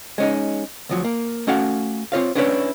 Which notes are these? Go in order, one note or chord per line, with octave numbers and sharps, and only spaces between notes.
G#3 C#4 D#4
D2 F3 F#3
A#3
A3 C#4 F#4 F5 F#5
C4 F4 C#5 F5
B3 C#4 D4 E4 B4 C#5